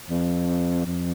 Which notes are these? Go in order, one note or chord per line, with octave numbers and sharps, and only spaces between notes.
F2
F2